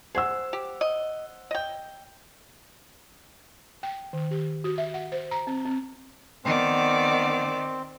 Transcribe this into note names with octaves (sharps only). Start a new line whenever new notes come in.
G#4 C5 F#5 E6
G4
D#5
D#5 G5
G5
D#3
G4
F#4
E5
F#5
C5
A#5
C4
C4
D#3 B3 C4 D5